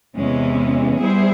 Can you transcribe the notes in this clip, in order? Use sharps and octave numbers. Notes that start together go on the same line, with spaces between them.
E2 C3 E3 G#3 C#4
G3 B3 E4 G#4 C5